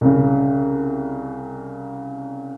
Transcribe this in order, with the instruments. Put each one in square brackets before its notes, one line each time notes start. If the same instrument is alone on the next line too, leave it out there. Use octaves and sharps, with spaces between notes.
[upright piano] C2 C#3